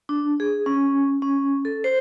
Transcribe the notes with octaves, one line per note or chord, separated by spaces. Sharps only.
D4
G#4
C#4
C#4
A4
C5